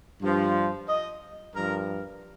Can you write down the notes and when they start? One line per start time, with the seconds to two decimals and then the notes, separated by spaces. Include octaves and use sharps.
0.22 G2 F3
0.88 D#5
1.55 G2 F3 A#4